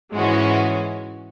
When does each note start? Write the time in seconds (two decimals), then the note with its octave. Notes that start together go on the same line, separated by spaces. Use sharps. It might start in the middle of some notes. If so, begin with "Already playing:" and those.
0.14 G#2 E3 G#3 C#4 F#4